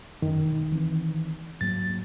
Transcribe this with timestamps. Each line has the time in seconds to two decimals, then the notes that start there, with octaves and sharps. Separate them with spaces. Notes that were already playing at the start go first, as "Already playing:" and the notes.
0.22 F#2 D#3
0.45 E1
0.72 E3 C4
1.61 G#2 F#3 A#3 A6